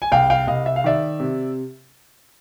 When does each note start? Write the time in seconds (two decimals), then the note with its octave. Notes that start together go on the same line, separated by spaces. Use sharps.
0.02 G#5
0.12 C2 F5 G5
0.30 F5 G5
0.47 C2 D#5 F5
0.66 E5
0.76 F5
0.84 D#3 D5 E5
1.20 C3